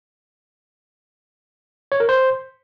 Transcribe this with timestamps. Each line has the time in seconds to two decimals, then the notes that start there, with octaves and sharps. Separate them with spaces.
1.92 C#5
2.00 A#4
2.09 C5